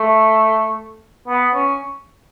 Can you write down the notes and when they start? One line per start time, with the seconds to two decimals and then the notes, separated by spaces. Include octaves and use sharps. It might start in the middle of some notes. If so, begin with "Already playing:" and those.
Already playing: A3
1.28 B3
1.55 C#4